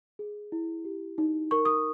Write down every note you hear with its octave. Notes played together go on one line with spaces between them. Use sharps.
G#4
E4
G4
D#4
A#4 C#6
D#6